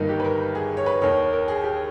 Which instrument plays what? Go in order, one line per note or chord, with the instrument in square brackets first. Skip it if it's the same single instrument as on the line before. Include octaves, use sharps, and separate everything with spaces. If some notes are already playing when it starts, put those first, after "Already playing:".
Already playing: [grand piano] G1 G2 D#3 A#3 D#4
G4
B4
A#4
G#4
C#5
B4
D#2 D#3 C#5
A#4
G#4
G4